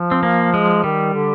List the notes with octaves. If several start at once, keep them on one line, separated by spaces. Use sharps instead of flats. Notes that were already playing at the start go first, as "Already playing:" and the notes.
Already playing: F3
C4
A#3
G#3
D#3 G3
D3